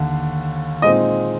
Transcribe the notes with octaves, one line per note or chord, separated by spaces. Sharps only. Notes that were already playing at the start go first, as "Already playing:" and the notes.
Already playing: D#2 D3
A#2 G#3 C4 D#4 D#5